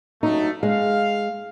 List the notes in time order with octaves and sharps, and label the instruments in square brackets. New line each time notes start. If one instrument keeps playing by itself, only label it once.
[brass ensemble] G2 F#3 A3 [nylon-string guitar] D#4
[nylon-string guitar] G#3 [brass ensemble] F5